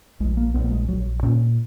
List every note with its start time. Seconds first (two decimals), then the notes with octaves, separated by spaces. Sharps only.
0.20 A#1 G#3
0.37 A#3
0.54 A#1 B3
0.64 A#3
0.72 G#3
0.88 A#1 F#3
1.23 A#2 C#4